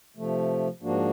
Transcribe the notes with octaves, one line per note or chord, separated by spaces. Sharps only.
C3 F3 A3
G#2 F3 A#3 D4 F#4